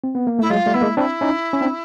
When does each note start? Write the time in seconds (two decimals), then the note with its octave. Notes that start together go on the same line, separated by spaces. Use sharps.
0.04 C4
0.15 B3
0.27 A#3
0.39 A3 E4
0.49 F#3 G#3 F4
0.66 G3 A3
0.73 B3 E4
0.81 G#3 A#3
0.97 C4 D4 E4
1.21 C#4 D#4
1.53 C#4
1.61 C4 D4